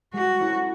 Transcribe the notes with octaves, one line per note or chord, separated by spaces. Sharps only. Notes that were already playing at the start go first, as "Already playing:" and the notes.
G#3 F#4
C#4 E4 A4